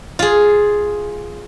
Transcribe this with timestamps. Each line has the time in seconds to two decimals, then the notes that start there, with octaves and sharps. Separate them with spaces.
0.19 F4 G#4